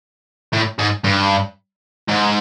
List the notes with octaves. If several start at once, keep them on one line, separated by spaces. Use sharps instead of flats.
A2
G#2
G2
G#2